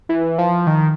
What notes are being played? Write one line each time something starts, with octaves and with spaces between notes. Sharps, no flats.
E3
F3
D#3